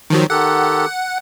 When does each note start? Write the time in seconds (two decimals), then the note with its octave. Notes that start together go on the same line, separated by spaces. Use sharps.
0.10 D#3 F3 F#3
0.30 D#3 G4 A4 F#5